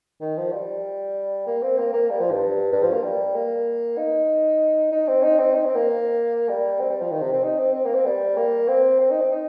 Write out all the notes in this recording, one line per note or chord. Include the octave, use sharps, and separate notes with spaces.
D#3
F3
G3
A#3
C4
A#3
A#3
G3
F3
G2
G2
F3
A#3
G3
A#3
D#4
D#4
C4
D#4
C4
D#4
C4
A#3
G3
C4
G3
F3
D#3
C3
C4
D#4
C4
C4
A#3
C4
G3
A#3
C4
C4
D#4
C4
D#4